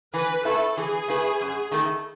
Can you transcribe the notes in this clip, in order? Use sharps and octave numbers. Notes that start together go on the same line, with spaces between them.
E3 B4
A3 E4 A4 B4
E3 G#4
A3 E4 B4
F#2
D#3 A3 E4 A4